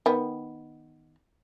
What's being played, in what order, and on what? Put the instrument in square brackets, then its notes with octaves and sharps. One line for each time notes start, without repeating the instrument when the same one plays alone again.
[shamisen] D#3 B3